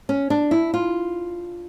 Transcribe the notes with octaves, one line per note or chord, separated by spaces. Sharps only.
C#4
D4
E4
F4